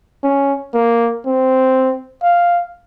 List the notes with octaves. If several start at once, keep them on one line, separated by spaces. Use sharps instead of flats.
C#4
A#3
C4
F5